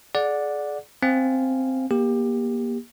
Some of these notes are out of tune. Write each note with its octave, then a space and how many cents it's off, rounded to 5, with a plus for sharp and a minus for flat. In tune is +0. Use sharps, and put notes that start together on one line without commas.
G#4 +35 D5 +0 F#5 -15
C4 +0 F5 +0 G#5 +0
A#3 +30 G4 +20